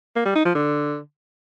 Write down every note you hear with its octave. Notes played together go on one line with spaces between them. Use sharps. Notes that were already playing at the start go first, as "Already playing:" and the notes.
A#3
G3
D#4
F3
D3